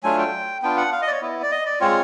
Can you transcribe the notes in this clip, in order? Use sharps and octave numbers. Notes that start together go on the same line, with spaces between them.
F#3 A3 D4 F4 G#5
G5
B3 D4 F4 G5
F#5
F5
D#5
D5
C#5
B3 E4
D5
D#5
D5
G#3 C4 F4 C#5